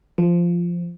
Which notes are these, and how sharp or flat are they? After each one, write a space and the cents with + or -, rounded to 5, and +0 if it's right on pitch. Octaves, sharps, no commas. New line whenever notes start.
F3 -10